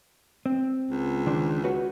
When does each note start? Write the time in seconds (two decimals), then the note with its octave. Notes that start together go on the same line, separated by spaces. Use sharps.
0.46 C4
0.91 C#2
1.26 D#3 D4 C5
1.64 F#4 B4 C#5